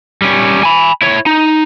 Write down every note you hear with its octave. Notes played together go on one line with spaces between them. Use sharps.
G3 C#4
G#5 B5
E4 C#5
D#4